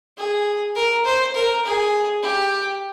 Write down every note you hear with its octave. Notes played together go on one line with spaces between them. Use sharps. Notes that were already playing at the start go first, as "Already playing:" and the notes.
G#4
A#4
C5
A#4
G#4
G4